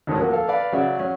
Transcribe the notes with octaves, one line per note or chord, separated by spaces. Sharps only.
D2 A2 D#3 G#3 C#5 D#6
F3 F#3 A#3 A#4
A4 F5
B4 D5 F5 B5
C#3 F#3 F#4 G#4 D5 E5
F#3 C#4